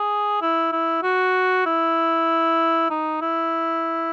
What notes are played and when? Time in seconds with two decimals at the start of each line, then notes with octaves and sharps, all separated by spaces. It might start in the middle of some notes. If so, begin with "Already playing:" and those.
Already playing: G#4
0.42 E4
0.72 E4
1.03 F#4
1.66 E4
2.90 D#4
3.21 E4